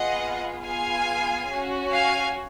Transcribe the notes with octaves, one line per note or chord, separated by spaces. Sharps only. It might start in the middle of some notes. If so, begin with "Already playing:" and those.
Already playing: B3 F4 G#4 D#5 F#5
B3 F4 G#4 F5 G#5
C#4 F#4
F5 G#5